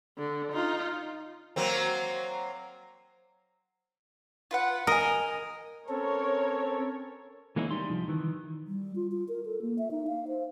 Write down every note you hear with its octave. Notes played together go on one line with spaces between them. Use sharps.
D3
D#4 F4
F#3 A#3 C4
F4 B4 F#5
A#4 D#5 G#5
C4 C#4 A4 A#4 C#5
E3 G#3 A#3 C#4 D#4 E4
G3 D#4 C6
C2 F3
D#3 E3
G3
F4
F4
A#4
A4
A#3
E5
D#4
F5
C5